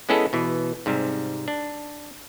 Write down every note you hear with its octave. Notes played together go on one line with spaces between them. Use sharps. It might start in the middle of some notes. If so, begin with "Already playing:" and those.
G#3 B3 C#4 E4 G#4 A4
B2 E3
G#2 C3 G3
D4